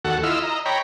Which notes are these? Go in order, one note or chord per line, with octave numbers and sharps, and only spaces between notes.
D#2 F#4 A4 F#5
E4 F4 D#5 E6 F6
D#5 A#5
C#5 G5 A#5 B5